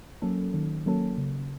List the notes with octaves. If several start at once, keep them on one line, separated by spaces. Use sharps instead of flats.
F#3 A#3 C#4 A4
D#3
F#3 A#3 C#4 A4
C#3